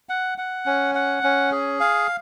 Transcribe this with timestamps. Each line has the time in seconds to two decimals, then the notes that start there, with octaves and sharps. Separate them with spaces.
0.09 F#5
0.38 F#5
0.66 C#4
0.95 F#5
1.23 C#4
1.52 G#4
1.80 F5